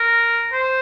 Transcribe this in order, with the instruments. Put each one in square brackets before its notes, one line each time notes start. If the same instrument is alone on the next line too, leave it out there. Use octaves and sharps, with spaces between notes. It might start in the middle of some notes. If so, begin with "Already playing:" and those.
Already playing: [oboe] A#4
C5